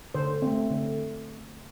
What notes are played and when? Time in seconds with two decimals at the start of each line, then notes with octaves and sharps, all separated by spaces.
0.14 D3 C5
0.42 A3 C4
0.71 D3